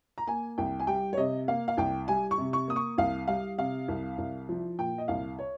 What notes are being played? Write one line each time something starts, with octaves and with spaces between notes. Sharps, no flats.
A#5
A#3 G#5
C2 G5
G#5
G3 G5
C#5
C3 D#5
A#3 F5
F5
C2 G5
G3 G#5
C#6
C3
C#6
A#3 D#6
C#6
C2 F5
G3 F5
C3 F5
C2
C2
F3
A#2 G5
D#5
C2 F5
C#5